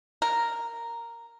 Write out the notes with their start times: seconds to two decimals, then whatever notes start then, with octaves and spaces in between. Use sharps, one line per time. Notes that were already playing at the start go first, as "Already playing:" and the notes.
0.22 A#4